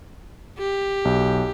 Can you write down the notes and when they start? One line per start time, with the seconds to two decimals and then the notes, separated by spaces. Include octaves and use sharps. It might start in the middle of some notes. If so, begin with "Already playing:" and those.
0.58 G4
1.05 B1